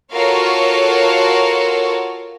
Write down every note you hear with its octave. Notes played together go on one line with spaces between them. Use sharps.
F4 F#4 A4 A#4 C#5 F5